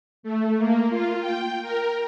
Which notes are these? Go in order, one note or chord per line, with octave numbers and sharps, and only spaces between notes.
A3
A#3
F4
G5
A#4